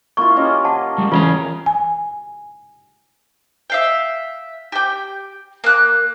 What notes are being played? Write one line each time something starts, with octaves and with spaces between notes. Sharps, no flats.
A#3 E4 F4 C#6
C#4 G4 D#5
F#5 A5
G3 G#3
C#3 E3 F4 G#4 B4 G5 A#5
G#5
E5 F5 G5
G4 G5
A#3 F#6